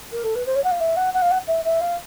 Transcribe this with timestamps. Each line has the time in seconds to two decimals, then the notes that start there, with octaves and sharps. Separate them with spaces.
0.12 A#4
0.24 A4
0.35 B4
0.46 C5
0.55 C#5
0.64 F#5
0.71 F5
0.80 E5
0.96 F#5
1.14 F#5
1.22 F5
1.31 F#5
1.47 E5
1.64 E5
1.81 F5